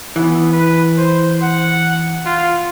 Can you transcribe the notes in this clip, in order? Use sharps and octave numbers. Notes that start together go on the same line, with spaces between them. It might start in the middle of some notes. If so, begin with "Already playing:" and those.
E3 B3
B4
C5
F#5
F4